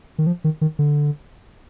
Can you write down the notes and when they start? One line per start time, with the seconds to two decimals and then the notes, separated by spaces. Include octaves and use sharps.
0.18 D#3
0.27 F3
0.44 D#3
0.61 D#3
0.79 D3